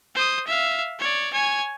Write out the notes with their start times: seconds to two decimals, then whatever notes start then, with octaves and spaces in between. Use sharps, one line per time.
0.15 C5 D#6
0.47 E5 F5
0.99 C#5 D5
1.33 C#5 G#5